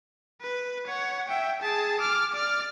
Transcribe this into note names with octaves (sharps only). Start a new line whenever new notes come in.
B4
C#5 F#5
E5 G5
G#4 A5
D6 F6
D5 F6